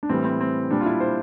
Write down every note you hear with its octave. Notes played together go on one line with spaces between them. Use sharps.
D4
A2 E3 G3 C4
C4
C4
A#2 G3 D4
F4
E4
C5